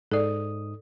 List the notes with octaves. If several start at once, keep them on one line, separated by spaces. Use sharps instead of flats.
G#2 D#4 A4 D5 D#6